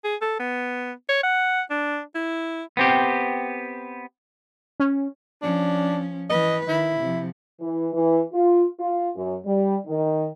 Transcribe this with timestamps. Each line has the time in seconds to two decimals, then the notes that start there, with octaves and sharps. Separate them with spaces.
0.04 G#4
0.22 A4
0.40 B3
1.09 C#5
1.23 F#5
1.70 D4
2.15 E4
2.77 B3 C4 G4
4.80 C#4
5.42 F3 C#4 D4
6.30 E3 B4 D#5
6.68 D#3 E4
7.00 C3 F3
7.61 E3
7.94 E3
8.33 F4
8.79 F4
9.16 F#2
9.45 G3
9.87 D#3